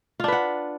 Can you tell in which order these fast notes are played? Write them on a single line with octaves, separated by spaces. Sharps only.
F4 D4 B4 F#5